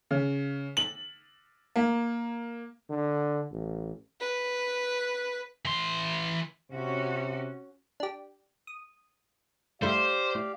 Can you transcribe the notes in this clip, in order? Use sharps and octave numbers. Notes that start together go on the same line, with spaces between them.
C#3
F#7
A#3
D3
A1
B4
E3 C6
C3 C#4 F#4
D4 G4
D#6
G2 A3 E4 G4 C5 D5 F5
A2